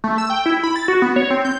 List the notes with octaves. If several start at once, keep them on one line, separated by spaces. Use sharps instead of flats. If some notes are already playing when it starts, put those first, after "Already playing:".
A3
E6
G5
E4
B5
A6
F#4
B3
C#5
C4
G6